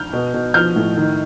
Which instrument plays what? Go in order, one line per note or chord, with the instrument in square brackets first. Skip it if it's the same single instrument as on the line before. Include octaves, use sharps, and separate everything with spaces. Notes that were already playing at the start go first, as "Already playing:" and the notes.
Already playing: [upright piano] F6 G6
B2
B2
F3 F6 G6
A2
D#3